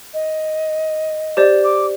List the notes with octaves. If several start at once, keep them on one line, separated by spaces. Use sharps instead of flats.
D#5
G4 C5 D5
D6